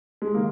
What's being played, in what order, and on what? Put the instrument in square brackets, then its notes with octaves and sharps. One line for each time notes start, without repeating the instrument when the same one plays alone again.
[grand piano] G#3
D#3 A#3